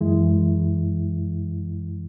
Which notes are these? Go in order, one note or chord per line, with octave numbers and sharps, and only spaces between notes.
F#2 E3 G#3 E4